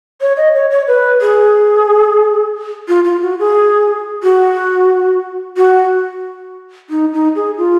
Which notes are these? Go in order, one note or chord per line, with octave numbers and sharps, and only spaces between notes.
C#5
D#5
C#5
C#5
B4
G#4
F4
F4
F#4
G#4
F#4
F#4
D#4
D#4
G#4
F4